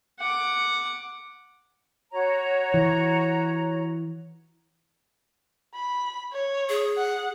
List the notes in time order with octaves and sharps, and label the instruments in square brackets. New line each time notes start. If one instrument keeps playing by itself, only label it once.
[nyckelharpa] F#5 D6
[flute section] F#4 C#5 A#5
[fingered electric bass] E3
[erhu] B5
C#5
[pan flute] G#4
[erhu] F#5